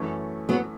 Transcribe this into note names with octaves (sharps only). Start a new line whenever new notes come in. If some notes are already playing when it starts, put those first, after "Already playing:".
Already playing: F#2 E3 A3 C#4
F#3 B3